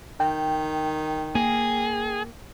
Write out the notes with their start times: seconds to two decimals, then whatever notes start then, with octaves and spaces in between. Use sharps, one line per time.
0.20 D#3 G5
1.35 A#3 G#4